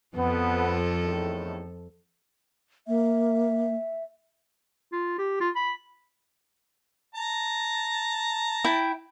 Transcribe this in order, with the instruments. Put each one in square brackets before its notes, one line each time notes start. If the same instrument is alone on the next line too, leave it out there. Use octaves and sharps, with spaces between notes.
[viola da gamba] F2 F3 A4 [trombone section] B3
[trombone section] E2 A2 D#3
[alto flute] A#3 [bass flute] E5
[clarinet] F4
G4
F4
B5
[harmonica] A5 A#5
[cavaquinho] E4 G5